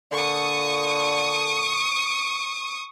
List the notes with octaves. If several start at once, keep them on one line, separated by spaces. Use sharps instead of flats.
A#2 D3 C#6 D#6